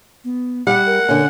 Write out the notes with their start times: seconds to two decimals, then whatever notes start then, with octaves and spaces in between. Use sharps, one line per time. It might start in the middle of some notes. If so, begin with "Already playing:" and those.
0.25 B3
0.67 G3 F#5
0.87 A#4
1.09 D3 C#4